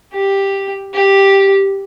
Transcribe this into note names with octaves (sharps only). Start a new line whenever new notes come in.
G4
G4